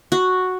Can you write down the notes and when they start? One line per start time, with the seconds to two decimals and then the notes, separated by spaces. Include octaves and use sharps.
0.12 F#4